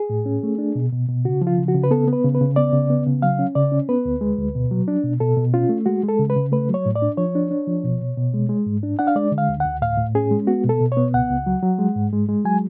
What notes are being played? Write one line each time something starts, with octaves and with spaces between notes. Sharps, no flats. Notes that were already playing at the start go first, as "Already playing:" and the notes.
Already playing: G#4
A2
C#4
A3
D4
B2
B2
B2
C#3 F#4
F3
F4
C#3
F#4
C#3
B4
B3 A4
B3
B4
C#3
B4
C#3
B3 D5
C#3
B3
C#3
F#3 F5
C#4
C#3 D5
C#4
B3 B4
D2
G#3
D2
B2
F#3
D4
B2
B2 A4
B2
C#4 F4
A3
G#3 F#4
G#3
A4
C#3
B4
C#3
A3 B4
F#3
C#5
A2
D5
D4
F3 C#5
D4
D4
F3
B2
B2
B2
G#3
G#3
G#2
D4
D4 F#5
F5
G#3 D5
D3
F5
D2
D2 F#5
A2 F5
A2
C#4 G#4
G#3
B3 F#4
B2
A4
B2
C#5
B3
C#2 F#5
C#2
F#3
F#3
G#3
G#2
G#3
G#3
F#3 G#5